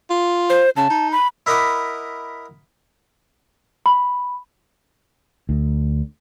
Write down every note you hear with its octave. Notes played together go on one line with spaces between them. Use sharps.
F4
C5
C#3 A5
D#4
B5
E4 A#4 D#5 F#5 B5 D6
B5
D2